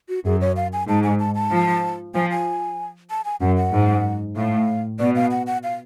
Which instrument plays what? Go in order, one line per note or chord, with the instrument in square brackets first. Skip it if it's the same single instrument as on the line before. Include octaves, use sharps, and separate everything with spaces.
[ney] F#4
[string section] F#2 [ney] G#4
[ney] C#5
F5
G#5
[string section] G#2 [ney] A5
[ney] G#5
A5
A5
[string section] F3
[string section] F3 [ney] G#5
[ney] G#5
A5
G#5
[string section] F#2 [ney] F#5
[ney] F#5
[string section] G#2
[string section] A2 [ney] F5
[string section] B2 [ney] D5
[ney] F5
F#5
F#5
F5